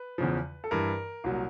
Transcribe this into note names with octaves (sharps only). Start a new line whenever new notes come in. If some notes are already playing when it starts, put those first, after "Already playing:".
Already playing: B4
E2 C#3 F3
A4
G2 E3 A#4
C2 A#2 F#3